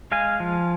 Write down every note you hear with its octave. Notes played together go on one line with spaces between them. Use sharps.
G#3 F5 G#5
F3